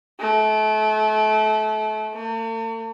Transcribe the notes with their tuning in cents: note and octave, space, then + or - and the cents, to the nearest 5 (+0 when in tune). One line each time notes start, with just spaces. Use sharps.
A3 -30
A3 +45